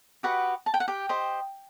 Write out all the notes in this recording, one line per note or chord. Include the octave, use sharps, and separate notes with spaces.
F#4 G4 B4 D#5 F#5
A5
G5
F#5
G4 G5
G4 C5 D#5